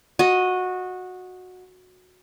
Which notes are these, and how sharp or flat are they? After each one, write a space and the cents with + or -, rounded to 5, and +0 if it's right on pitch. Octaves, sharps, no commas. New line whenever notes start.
F#4 -15 D#5 +0